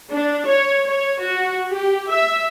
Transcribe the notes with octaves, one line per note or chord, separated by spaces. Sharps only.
D4
C#5
C#5
F#4
G4
E5